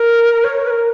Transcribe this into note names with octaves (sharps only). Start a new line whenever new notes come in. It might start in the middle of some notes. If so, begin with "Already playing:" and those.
Already playing: A#4
C#5
B4
A#4